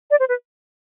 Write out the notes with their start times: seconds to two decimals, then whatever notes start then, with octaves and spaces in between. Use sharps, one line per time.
0.11 D5
0.20 C5
0.29 B4